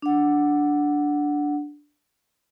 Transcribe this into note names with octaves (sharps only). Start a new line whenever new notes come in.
D4 F#5